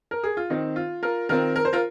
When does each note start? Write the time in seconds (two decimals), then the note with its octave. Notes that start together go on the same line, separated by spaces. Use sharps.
0.11 A#4
0.23 G#4
0.37 F4
0.50 D#3 C4 D#4
0.76 F4
1.03 F4 A#4
1.29 D#3 C4 F4 A#4
1.56 A#4
1.65 C5
1.73 F4 A#4